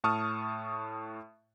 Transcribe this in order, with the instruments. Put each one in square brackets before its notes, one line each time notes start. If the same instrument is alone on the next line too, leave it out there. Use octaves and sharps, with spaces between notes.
[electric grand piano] A2 A5 C#6 D#6 F6